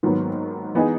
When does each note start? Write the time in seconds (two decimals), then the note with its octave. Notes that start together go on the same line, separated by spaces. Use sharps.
0.03 G#2 D#3 F#3 B3
0.75 E3 B3 D#4 G#4